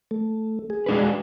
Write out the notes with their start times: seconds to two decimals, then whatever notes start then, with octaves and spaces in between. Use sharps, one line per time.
0.11 A3
0.70 G#4
0.86 G#3 D4 B4